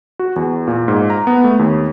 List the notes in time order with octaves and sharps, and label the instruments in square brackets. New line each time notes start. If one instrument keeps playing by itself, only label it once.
[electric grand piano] F#4
E2
A#2
G#2
A#5
B3
A3
D#2